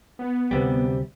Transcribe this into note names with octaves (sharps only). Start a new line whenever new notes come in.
B3
D2 C3 G3